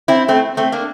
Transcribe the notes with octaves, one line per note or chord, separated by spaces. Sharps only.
C4 E4
A3 C4
A3 C4
A#3 D4